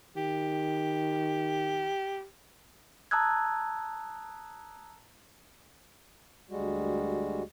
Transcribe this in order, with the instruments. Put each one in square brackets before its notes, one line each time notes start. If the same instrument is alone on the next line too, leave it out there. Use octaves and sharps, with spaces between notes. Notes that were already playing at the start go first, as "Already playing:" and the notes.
[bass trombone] D#3 [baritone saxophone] G4
[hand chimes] A5 A#5 D#6 E6 F#6 G#6
[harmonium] D2 G3 G#3 F#4